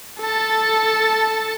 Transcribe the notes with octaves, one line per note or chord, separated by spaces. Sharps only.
A4 A5